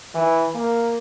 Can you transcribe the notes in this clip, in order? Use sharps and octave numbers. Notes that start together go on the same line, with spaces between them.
E3
A#3